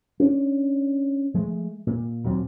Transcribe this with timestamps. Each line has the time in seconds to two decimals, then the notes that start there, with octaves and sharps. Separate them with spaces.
0.20 C#4 D4
1.34 F3 G#3 A3
1.87 A#2
2.24 D#2 A#2 F#3 C4